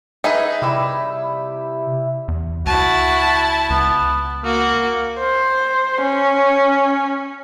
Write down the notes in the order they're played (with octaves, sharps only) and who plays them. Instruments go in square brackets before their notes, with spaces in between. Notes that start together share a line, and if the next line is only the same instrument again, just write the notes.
[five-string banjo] D#4 G#4 B4 [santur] E5
[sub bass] C3 [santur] G3 E4 E6
[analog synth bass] E2
[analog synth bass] C#2 [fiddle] E4 A5 [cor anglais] F#4
[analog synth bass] C#2 [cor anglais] B3
[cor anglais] A#3 [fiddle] F#4
[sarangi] C5
C#4